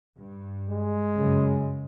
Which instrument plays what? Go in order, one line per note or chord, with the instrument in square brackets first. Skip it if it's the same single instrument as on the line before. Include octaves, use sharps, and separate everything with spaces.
[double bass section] G2
[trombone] G#3
[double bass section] F#2 C#3